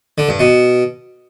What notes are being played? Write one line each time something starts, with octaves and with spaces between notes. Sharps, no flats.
D3
G2
B2